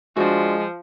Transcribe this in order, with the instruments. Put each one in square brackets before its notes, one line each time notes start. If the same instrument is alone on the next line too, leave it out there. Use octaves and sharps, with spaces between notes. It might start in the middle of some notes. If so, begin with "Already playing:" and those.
[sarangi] F3 [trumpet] G#3 [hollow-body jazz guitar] D4 F#4